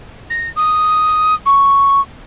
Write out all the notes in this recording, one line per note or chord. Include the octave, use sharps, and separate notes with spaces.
A#6
D#6
C#6